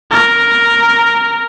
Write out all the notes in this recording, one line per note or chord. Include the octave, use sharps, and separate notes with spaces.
A#4